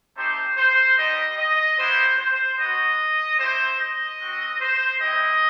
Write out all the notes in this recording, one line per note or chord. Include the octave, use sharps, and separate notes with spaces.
A3 C4 D#4 G4 C5
C5
G3 D#4 G4 D#5
D#5
B3 E4 G4 C5
C5
B3 F#4 D#5
C4 E4 G4 C5
D#5
C4 F#4
C5
C4 E4 G4 D#5